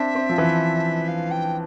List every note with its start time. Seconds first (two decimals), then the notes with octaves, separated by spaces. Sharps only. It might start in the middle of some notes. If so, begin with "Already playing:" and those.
Already playing: C4 D4 E5
0.15 C4
0.30 F3
0.38 E3
1.08 F5
1.31 G5